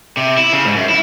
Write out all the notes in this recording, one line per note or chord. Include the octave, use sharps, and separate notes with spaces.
C3
E4
C#3
G#2
F#2
E4